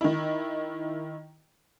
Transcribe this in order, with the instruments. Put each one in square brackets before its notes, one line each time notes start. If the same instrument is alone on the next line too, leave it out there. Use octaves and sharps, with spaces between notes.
[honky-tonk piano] D#3 E4